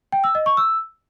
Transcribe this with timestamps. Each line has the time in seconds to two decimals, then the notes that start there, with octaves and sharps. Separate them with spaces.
0.12 G5
0.24 E6
0.35 D#5
0.46 C#6
0.57 E6